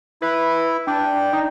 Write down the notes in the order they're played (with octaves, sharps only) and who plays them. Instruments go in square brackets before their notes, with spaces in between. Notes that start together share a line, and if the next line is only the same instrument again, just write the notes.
[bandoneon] E4 [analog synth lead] B4
[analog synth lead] D4 [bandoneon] G5
[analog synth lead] D#4